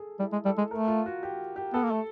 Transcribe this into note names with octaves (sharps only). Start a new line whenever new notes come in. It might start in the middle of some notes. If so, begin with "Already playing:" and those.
Already playing: G#4 A4
G3 E4
G#3
G3 A4
G#3
A3 A#4
F4
F#4
G4
G4
B3 A4
A#3
A3